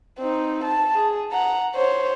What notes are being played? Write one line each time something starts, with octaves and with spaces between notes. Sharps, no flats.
C4 D#4
A5
G#4
F#5 A#5
C5 C#5